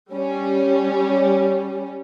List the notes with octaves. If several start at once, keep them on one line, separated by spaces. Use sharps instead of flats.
G3 C#4